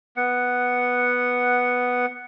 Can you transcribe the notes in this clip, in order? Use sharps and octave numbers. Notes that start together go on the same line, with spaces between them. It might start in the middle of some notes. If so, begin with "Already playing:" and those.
B3 F#5